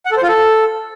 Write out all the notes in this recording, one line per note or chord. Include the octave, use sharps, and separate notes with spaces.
F#5
A4
C5
F4
A4